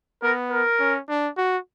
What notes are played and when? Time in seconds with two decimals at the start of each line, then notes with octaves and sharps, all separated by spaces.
0.23 B3 A#4
0.52 A#4
0.80 C#4
1.09 D4
1.37 F#4